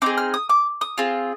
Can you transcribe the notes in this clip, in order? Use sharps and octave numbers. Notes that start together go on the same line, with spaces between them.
C4 D#4 G#4 D6
F6
D#6
D6
D#6
C4 F4 G#4